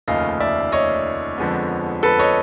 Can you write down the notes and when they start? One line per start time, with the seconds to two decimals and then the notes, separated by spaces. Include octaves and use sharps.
0.08 F1 D#2 C#3 F3 A3 D#5 F5
0.40 D5 E5
0.72 C#5 D#5
1.38 F2 D3 F3 G#3 B3
2.03 A4 B4
2.19 C#5 D#5